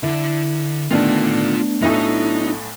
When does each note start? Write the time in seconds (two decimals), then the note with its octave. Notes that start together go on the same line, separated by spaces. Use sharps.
0.03 D3 E4
0.91 D3 D#3 A3 B3 D4 F4 D5
1.82 B1 A2 F#3 D#4 E4 A4